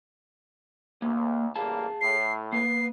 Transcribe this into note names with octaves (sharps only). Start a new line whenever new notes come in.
D2 A#3
A1 G3 A#3 G#4 F5 A5
A2 C7
A#3 B3 C7